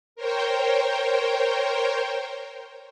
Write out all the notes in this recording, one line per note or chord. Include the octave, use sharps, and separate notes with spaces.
A#4 C5 C#5 G5